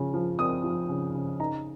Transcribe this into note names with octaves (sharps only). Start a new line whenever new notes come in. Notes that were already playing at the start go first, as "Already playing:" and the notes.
Already playing: C#3 F3
F3
C4 D#6
F3
C#3
C#3
D#4 A#5